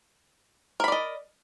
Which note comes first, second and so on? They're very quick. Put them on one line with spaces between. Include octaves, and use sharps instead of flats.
A#4 B5 D5 D#5